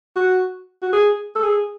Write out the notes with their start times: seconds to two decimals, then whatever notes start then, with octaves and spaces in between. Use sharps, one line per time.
0.16 F#4
0.82 F#4
0.93 G#4
1.36 A4
1.43 G#4